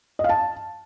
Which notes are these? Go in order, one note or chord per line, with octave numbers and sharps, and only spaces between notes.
D#5
F5
A5